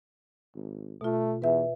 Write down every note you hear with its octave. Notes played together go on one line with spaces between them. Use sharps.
G#1
B2 A3 F4
E2 B4 E5